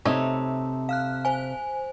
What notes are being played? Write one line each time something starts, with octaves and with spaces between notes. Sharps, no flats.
C3 A3 D#4 C#5
F5 F6 F#6
C5 G#5